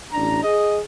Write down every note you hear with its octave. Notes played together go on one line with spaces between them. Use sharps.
A1 D4 A#5
G#4 D#5